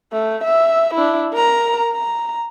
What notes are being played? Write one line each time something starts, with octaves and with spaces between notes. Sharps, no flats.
A3
E5
D4 E4
A#4 A#5
A#5